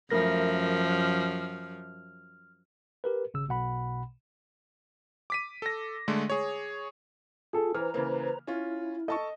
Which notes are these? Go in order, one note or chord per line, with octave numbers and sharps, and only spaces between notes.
F#2 F3 A3 A#4 A#6
F6
G4 A#4 B4
G#1 C#3 E6
B1 B2 F#5 B5
D6 B6 D#7
A4 A#6
D3 G#3 A3
G#4 C#5
F4 G#4 A4
E3 B4 C5 A#5 F6
C#3 E3 A#3
C#4 E4 F4
A4 D#5 A5 C#6